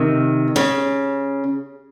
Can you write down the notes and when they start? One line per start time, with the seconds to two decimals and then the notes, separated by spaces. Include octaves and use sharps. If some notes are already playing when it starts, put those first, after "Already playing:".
Already playing: C3 D#3
0.56 C#3